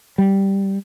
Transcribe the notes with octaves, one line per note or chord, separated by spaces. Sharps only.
G3